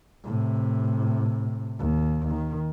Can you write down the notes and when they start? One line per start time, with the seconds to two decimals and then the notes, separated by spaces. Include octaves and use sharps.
0.25 A2 C3
1.79 D#2
2.30 D#3